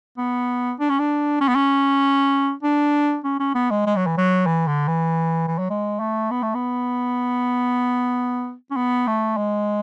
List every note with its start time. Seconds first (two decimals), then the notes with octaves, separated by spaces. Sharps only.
0.18 B3
0.80 D4
0.89 C#4
0.99 D4
1.41 C#4
1.48 B3
1.55 C#4
2.63 D4
3.24 C#4
3.39 C#4
3.55 B3
3.70 G#3
3.86 G#3
3.96 F#3
4.07 E3
4.17 F#3
4.46 E3
4.67 D3
4.88 E3
5.48 E3
5.59 F#3
5.70 G#3
6.00 A3
6.30 B3
6.42 A3
6.55 B3
8.71 C#4
8.76 B3
9.07 A3
9.37 G#3